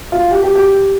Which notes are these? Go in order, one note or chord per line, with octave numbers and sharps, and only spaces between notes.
F4
G4
G4
G4